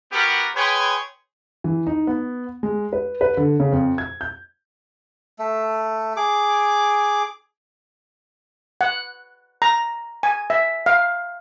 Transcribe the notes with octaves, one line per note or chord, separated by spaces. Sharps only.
B3 F#4 G4 A#4 F#5
G#4 B4 C#5 G5 G#5 C6
E3
D#4
B3
G#3
B4
B4
D3
C#3
F2
G#6
G6
A3
G#4 D6
F#5
A#5
G#5
E5
F5